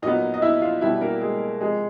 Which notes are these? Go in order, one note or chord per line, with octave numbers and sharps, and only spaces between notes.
A#2 F#3 B3 D#4 D#5
D#5
E4 E5
F4 F5
B2 G3 B3 E4 E5
A#3 A#4
G#3 G#4
C3 F3 G#3 G#4